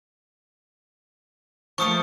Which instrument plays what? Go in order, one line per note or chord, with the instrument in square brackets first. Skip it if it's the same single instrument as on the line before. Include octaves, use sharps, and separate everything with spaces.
[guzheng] F3 A3 A#3 [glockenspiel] C#6 D#6 C#7